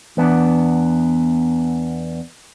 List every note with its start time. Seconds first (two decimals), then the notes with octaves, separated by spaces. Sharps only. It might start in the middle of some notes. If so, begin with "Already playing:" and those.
0.17 E2 B3 D4